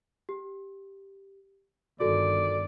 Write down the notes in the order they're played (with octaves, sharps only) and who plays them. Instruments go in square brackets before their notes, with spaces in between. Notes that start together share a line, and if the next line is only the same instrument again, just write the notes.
[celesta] G4
[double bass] G1 D#3 [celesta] F#4 A4 [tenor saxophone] D5